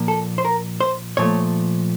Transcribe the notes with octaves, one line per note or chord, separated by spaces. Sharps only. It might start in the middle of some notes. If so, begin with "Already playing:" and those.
Already playing: A#2 F3 A#3
A4
C5
A#4
C5
A#2 F3 A3 C#5